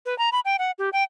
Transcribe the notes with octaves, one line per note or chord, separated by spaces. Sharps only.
B4
A#5
B5
G5
F#5
G4
G5